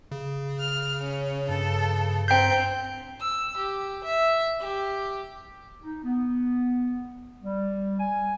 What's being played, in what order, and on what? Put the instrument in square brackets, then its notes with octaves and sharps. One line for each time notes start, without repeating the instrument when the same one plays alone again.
[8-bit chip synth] C#3
[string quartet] F6
C#4
[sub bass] G2 [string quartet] A4
[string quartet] C4 [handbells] G5 G6 [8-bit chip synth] A#5 B6 C7
[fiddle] E6
G4
E5
G4
[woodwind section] D#4
B3
G3
G#5